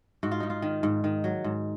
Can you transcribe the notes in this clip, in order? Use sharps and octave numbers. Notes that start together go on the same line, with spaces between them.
G#2 F#4
F4
G#2 D#4
F4
D#3
G#2
D#3
F#3
G#2